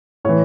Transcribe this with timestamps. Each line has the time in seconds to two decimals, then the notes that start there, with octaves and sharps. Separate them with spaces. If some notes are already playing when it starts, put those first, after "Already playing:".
0.25 A2 E3 C#5